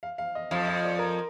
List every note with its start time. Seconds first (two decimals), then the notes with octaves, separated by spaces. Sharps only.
0.03 F5
0.18 F5
0.35 D#5
0.51 F2 F3 F5
0.67 D#5
0.84 D5
0.99 A#4